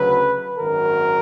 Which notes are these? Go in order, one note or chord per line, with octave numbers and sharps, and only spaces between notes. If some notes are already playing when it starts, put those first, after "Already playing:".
Already playing: D2 C#3 F#3 B4
G#1 F#2 D#3 F#3 A#4